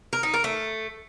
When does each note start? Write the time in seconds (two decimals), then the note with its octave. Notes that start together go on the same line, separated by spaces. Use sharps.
0.13 A#4
0.23 D#4
0.34 A#4
0.44 A3